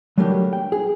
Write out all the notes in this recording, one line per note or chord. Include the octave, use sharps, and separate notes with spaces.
F#3 G3 A3 A#3 D4 G4
G5
G#4